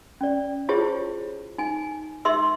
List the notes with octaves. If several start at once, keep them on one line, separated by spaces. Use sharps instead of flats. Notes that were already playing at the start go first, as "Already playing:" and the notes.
C#4 D5
E4 F4 G4 G#4 C5 C#5
D#4 G#5
D#4 G4 E5 C6 E6